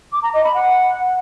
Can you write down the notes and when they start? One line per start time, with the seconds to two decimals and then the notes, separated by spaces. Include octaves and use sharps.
0.12 D6
0.22 A#5
0.33 D#5
0.43 B5
0.54 F#5